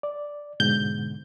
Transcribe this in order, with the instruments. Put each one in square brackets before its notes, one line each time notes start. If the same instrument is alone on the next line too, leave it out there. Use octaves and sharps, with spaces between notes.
[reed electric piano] D5
[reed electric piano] G#2 B2 D3 [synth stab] G6